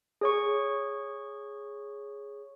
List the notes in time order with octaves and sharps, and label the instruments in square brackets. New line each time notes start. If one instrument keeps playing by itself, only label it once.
[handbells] G#4 C#5 C#6